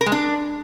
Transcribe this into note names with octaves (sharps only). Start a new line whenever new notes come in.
A#4
G#3
D4